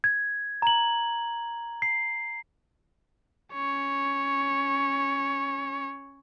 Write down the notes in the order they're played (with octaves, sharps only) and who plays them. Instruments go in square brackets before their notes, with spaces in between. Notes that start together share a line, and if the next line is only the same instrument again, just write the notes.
[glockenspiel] G#6
A#5 F#7
C7
[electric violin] C#4 C#5